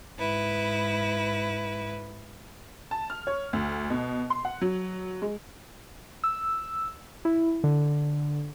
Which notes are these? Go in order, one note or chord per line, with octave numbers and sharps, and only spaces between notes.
G#2 E4 B4
A5
F6
C#5
D2
B2
C6
F#5
F#3
G#3
E6
E4
D3